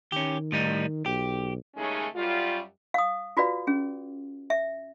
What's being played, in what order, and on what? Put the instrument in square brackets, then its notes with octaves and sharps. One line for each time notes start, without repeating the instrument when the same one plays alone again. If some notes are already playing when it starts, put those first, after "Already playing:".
[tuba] D#3 [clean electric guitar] C#4 G4
[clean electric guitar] A2 G3 D#4
[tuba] B1 [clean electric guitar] G4
[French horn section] D#2 C#3 G#3 A3 C#4 D#4
F#2 G3 F4
[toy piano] F5 D#6
F4 F#4 B4 D5 F5
C#4 G#4
E5